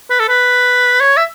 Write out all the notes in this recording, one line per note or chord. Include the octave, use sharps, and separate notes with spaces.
B4
A4
B4
C#5
E5